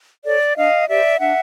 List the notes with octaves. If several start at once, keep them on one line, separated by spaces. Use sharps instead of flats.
A4 C#5 D5
D4 D#5 F5
G4 C5 D5 E5
D4 E5 F#5